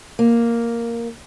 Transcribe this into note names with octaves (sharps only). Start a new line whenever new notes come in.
A#3